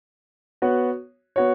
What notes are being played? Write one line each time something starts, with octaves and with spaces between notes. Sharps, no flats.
B3 F#4 C#5
B3 F#4 C#5